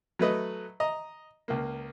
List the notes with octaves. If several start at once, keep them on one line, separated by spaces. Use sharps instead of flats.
F#3 A3 B4 D#5
D#5 A#5
C#2 A#3